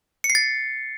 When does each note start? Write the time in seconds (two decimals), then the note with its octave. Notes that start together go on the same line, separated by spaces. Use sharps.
0.24 C#7
0.30 C7
0.35 A6